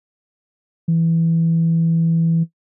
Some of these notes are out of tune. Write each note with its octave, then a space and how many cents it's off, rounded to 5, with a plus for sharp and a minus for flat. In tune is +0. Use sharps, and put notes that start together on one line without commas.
E3 +0